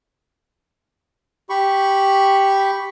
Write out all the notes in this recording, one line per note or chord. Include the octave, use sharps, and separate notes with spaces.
G4 B5 C#6